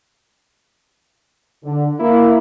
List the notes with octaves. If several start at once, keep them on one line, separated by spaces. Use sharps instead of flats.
D3
A#3 E4